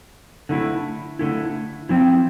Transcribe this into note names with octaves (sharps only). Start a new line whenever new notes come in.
D3 A3 E4
D3 A3 E4
F3 C4 E4